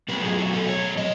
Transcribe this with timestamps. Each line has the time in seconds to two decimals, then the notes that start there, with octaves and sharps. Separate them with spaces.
0.08 B2 F#3 A3 B4
0.24 G#4
0.38 F#4
0.53 A4
0.69 C#5
0.97 D#5